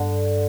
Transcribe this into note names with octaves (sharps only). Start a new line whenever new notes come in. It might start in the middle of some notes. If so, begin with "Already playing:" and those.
Already playing: G2 D3